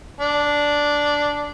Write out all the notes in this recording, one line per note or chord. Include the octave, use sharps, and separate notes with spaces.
D4